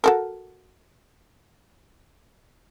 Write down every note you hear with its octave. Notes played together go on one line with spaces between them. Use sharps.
F#4 A4 A#4